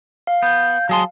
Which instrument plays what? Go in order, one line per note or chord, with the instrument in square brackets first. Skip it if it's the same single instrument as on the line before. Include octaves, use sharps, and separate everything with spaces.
[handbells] F5
[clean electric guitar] B3 [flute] G6
[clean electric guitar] F#3 G#4 C6 [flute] A5